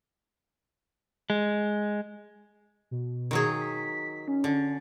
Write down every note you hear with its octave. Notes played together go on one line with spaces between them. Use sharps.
G#3
B2
D#3 F#3 G#4
B6
C#4
D3